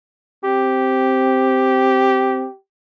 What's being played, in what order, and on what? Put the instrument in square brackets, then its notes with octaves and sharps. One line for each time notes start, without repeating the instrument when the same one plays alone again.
[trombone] C4 [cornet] G4